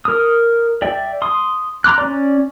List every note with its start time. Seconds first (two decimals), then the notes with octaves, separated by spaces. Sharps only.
0.05 A#4 D#6
0.82 D5 E5 G5
1.22 C6 D#6
1.84 A#5 C6 D6 F#6
1.98 C#4 D5